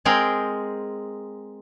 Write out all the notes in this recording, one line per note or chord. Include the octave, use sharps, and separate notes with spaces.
G#3 C4 G#4 A#4 G5